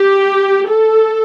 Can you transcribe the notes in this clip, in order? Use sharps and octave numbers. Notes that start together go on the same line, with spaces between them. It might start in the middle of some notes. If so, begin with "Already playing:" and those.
Already playing: G4
A4